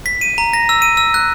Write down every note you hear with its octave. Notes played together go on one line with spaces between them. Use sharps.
B6
D#7
A#5
A#6
E6
D#7
E6
F#6